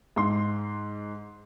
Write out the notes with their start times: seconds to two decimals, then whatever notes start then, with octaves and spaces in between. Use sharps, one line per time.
0.16 G#2 C6